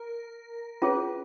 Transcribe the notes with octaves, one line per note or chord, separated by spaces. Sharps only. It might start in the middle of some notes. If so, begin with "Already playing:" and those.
Already playing: A#4
C#4 F4 G#4 B4 C#5